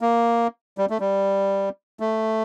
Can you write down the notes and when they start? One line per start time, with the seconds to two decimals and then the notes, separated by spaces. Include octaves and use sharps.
0.01 A#3
0.78 G3
0.90 A3
1.00 G3
2.00 A3